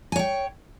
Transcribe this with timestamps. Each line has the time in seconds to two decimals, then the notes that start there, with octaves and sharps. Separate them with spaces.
0.12 G#5
0.16 C#5
0.19 G5